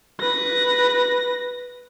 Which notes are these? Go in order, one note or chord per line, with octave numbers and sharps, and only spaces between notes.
B4 A#6